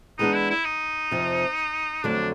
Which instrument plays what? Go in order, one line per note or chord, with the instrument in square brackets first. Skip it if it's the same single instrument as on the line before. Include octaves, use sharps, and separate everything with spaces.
[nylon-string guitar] E3 G#3 B3 D4 [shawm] D#4
[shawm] E4
E4
D#4
[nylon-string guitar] F2 C3 F3
[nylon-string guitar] F2 D3 F#3 A3 [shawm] D4